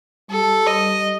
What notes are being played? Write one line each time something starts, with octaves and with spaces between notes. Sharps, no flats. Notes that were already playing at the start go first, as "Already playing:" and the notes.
G3 A4
D#5